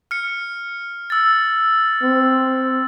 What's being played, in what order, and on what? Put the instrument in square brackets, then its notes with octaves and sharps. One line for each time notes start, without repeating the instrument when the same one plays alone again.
[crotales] F6 C#7
E6 A6
[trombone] C4